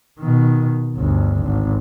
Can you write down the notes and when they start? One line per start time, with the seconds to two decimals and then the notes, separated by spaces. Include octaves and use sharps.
0.19 B2 D#3
0.97 G1 D2
1.42 G#1